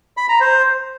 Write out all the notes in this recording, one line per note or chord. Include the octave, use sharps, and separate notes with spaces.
B5
A#5
C5